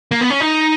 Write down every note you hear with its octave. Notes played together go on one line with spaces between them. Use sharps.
A#3
B3
C#4
D#4